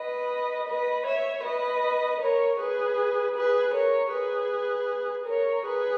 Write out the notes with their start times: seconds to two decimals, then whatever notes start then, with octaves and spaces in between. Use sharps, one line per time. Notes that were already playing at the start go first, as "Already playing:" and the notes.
Already playing: B4 D#5
0.68 B4 D#5
1.06 C#5 E5
1.44 B4 D#5
2.21 A#4 C#5
2.59 G#4 B4
3.35 G#4 B4
3.74 A#4 C#5
4.12 G#4 B4
5.26 A#4 C#5
5.65 G#4 B4